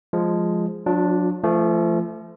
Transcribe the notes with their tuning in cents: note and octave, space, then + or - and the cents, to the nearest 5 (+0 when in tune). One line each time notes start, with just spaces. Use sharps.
F3 +0 G#3 +0
F#3 -35 D4 +0 F4 +25
F3 -30 A3 +0